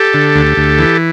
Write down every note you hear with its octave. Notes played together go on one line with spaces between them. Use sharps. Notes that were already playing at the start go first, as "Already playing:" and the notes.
Already playing: G4 A4
D3
D2
D2
E3